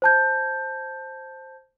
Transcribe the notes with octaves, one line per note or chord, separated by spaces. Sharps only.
C5 A5 G6